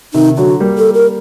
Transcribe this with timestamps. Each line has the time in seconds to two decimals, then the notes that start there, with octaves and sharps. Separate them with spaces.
0.14 C3 D#3 D#4
0.37 D3 F#3 F#4
0.60 G3 A#3
0.78 A4
0.94 A#4